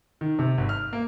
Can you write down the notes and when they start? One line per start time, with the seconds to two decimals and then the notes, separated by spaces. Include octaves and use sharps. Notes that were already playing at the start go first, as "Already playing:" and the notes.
0.21 D#3
0.39 C3
0.58 G#1
0.69 F6
0.93 A#3